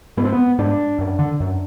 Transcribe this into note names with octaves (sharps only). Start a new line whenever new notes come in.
G#2 B3
C4
B3
G#2 D4
F#2
D3
F#2